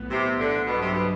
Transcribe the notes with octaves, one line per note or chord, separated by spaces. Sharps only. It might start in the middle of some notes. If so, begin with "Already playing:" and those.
Already playing: B1 A2 E3 B3
C3
D3
G2 B2 D3 F#3
C3
B2